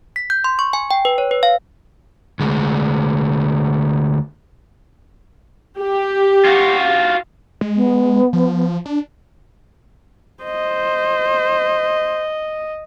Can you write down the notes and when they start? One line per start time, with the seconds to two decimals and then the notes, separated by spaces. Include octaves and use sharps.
0.16 B6
0.30 G6
0.44 C6
0.59 C#6
0.73 G#5
0.91 G5
1.05 B4
1.18 C#5
1.31 B4
1.43 F5
2.40 D2 G#3
5.79 G4
6.45 F4 F#4
7.61 G#3
7.75 B3
8.33 F3
8.85 D4
10.43 C5 D#5